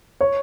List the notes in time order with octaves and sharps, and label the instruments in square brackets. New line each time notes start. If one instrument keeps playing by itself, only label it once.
[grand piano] C#5